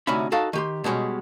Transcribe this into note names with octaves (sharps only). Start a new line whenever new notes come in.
D2 C3 C#4 D#4 E5 B5
D#4 F#4 A4 F5
D#3 G4 C6
B2 G3 G#3 C#4 G4